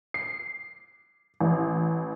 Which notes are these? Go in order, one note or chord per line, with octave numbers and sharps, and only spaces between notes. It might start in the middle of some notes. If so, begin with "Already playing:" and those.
C7
A1